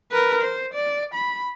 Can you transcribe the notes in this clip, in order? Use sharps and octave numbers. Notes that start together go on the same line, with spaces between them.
A#4 B4
C5
D5
B5